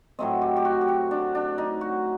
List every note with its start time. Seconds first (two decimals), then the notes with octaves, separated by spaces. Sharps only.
0.19 A2 F#3 A3 C4 D#5
0.42 G4
0.57 G4
0.65 F#4
0.81 G4
0.88 F#4
1.11 D4
1.35 D4
1.58 D#4
1.81 F#4